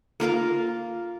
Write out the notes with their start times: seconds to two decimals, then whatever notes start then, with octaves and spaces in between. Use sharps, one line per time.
0.20 A#3 F4 A#4 F5